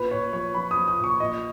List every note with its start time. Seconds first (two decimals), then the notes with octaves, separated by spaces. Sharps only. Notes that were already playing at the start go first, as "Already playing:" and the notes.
Already playing: A#2 B4
0.11 A#2 C#5
0.33 F3 C#5
0.55 F3 B5
0.71 D#6
0.77 F3
0.88 D#6
0.98 A#2
1.04 C#6
1.20 A#2 D#5